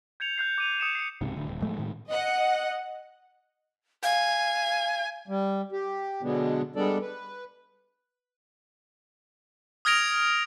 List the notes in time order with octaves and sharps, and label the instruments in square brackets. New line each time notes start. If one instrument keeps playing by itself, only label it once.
[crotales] G6 G#6 C#7 F7
F#6 G6 C7
D6 D#7 F7
D#6 C#7 E7
C7 C#7
[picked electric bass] C#2 G#2 C3
D1 D2
D#1
A2 F3 G#3 A3
A2 D#3 G#3
[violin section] D#5 F#5
[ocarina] F5 [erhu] G#5
[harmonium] G3
G4
B2 D3 F#3 G#3 B3 D4
G3 G#3 B3 D4 A4 D5
B4
[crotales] D#6 F6 G#6 A#6 D7 F7